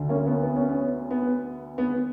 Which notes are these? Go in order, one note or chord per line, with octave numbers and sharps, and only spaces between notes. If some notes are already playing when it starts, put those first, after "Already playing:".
Already playing: D2 D3
A#3 C#4
B3
B3
C#4
B3
B3
B3